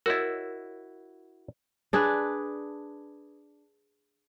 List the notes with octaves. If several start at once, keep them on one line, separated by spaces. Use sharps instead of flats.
E4 F#4 A#4 C#5 D#5
D4 G#4 B4